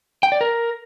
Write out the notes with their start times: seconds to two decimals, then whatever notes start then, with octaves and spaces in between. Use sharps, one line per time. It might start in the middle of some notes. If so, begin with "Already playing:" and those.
0.23 G5
0.32 D5
0.41 A#4